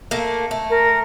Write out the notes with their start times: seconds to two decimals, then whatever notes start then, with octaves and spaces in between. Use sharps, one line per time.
0.11 A3 A#3
0.51 A3
0.70 A#4